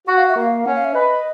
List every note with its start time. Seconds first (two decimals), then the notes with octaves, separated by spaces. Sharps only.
0.07 F#4 F#5
0.17 F5
0.29 E5
0.36 A#3 F5
0.65 C#4 F#5
0.75 F5
0.84 E5
0.94 B4 D#5